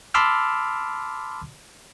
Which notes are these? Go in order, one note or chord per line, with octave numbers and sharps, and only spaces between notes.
A5 B5 C6 D6 E6 F6